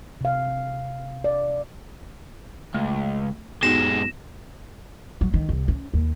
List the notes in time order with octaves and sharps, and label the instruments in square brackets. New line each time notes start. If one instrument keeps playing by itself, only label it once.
[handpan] C3 F5
D5
[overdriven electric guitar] C#2 [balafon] A3
[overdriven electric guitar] F#2 G#3 [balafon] B3 D#4 F#4 [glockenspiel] A#6 E7
[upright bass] F#3
D#3
C2
C#4
D#2